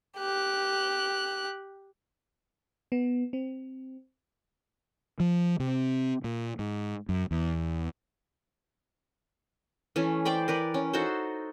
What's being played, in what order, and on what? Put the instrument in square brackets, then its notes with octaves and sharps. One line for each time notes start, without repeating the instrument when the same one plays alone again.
[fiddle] G4 F#6
[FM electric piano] B3
C4
[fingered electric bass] F3
C3
A#2
G#2
F#2
E2
[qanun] E3 A3 C#4
C5 D5 G5 B5
A#4 B4 D5
C#4
D#4 F#4 A4 C5